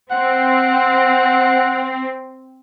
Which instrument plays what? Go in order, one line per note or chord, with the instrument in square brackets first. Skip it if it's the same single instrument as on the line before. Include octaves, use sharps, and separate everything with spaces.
[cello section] C4 [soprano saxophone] F#5